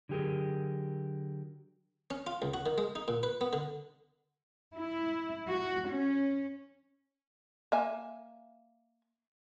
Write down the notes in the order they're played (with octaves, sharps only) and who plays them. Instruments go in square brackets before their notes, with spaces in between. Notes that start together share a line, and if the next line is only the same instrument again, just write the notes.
[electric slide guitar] D3 F#3 G4 G#4 A#4
[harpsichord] C#4
F4
C#2
F#4
D#3
G#3
D#4
A#2
B4
B3
D3
[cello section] E4
F#4
C#4
[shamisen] A#3 E5 G#5